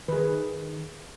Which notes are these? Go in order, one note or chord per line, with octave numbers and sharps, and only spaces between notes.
D#3 G#4 B4